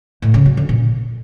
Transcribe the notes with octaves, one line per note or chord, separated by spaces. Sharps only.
A2
C#3
F#3
D3
A#2